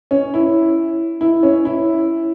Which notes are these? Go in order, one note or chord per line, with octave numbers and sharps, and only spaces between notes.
C#4
E4
E4
C#4
E4